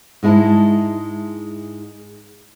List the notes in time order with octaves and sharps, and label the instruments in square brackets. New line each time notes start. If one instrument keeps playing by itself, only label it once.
[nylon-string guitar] G#2 G#3 E4 A5